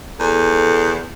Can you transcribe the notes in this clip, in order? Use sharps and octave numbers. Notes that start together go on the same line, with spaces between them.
E2 A4